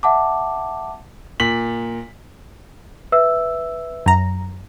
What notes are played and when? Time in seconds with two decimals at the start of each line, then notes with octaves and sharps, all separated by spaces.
0.03 E5 F#5 A5 D6
1.40 A#2 B6 F#7
3.12 B4 E5 E6
4.06 F#2 A#5